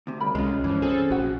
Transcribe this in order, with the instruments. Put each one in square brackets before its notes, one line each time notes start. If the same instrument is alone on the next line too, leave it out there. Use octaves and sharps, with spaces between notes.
[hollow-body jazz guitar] D2 C3
[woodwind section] C#3 G3 [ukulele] A#4 B5
[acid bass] C2 [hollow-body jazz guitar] G#3 F4 [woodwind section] C#4
[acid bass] G2 [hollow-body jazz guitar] E3 F3
[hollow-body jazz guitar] C4 G#4 [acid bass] A4
[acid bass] A#1 [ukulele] F#4 A4 F#5